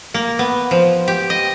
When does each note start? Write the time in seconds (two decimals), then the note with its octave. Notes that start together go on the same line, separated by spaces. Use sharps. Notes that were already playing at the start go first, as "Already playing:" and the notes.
0.14 A#3
0.39 B3
0.71 F3
1.08 G4
1.30 D#5